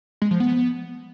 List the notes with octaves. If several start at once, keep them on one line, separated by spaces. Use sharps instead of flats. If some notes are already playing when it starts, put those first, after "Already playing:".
G#3
F3
B3